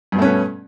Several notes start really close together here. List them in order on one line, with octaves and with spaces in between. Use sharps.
G2 B2 A3 C#4 B3